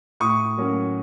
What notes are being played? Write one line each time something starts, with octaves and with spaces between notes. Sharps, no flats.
A2 C#6 D#6
F#3 A#3 C#4